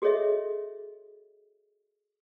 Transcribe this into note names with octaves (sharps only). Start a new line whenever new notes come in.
F#4 G#4 A4 C#5 D#5 E5